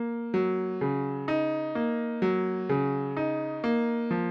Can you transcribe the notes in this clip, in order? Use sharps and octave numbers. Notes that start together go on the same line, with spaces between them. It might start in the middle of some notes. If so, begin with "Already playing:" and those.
Already playing: A#3
F#3
C#3
D#4
A#3
F#3
C#3
D#4
A#3
F3